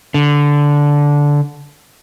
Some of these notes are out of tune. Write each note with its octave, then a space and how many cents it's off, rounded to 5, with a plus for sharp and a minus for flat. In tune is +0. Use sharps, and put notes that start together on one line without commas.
D3 -10